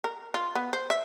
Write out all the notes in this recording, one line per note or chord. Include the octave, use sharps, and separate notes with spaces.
A#4
F4
B3
C5
E5